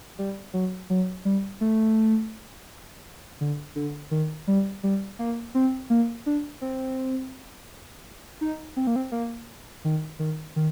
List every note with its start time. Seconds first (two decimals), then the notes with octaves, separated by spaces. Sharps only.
0.19 G3
0.54 F#3
0.90 F#3
1.25 G3
1.61 A3
3.41 D3
3.76 D3
4.11 D#3
4.47 G3
4.83 G3
5.19 A#3
5.55 C4
5.90 A#3
6.26 D4
6.61 C4
8.41 D#4
8.77 C4
8.87 A#3
8.96 C4
9.12 A#3
9.84 D#3
10.19 D#3
10.56 D#3